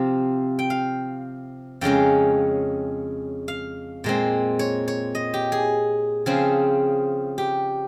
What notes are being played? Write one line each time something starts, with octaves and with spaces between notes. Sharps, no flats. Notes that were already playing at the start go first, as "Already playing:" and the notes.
Already playing: C3 F3 C4 F5
G5
F5
F2 C#3 G#3 C#4 G5
F5
A#2 G#3 C4
C#5
C#5
D#5
G4
G#4
C#3 F3 C4 G#4
G4